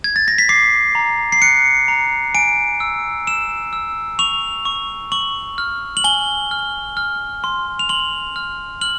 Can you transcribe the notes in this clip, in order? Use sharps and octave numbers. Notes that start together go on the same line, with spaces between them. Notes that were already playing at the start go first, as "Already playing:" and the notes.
G#6
A6
A#6
B6
D6 C7
A#5
C7
F#6 C#7
A#5
G#5 D7
E6
E6 E7
E6
C#6 F7
C#6
C#6 F#7
F6
F#7
G#5 G7
F6
F6
C6
F7
C6 F#7
F6
F6 F#7